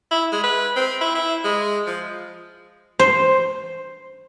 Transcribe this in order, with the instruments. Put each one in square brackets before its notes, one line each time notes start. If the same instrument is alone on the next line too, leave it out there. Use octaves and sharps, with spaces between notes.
[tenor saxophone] E4
G#3
B4
C4
E4
E4
G#3
F3
[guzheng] C5